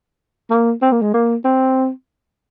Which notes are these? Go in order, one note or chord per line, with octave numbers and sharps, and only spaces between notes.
A#3
C4
A#3
G#3
A#3
C4